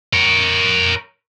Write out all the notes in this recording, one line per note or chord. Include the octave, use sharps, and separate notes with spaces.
A#4 C#5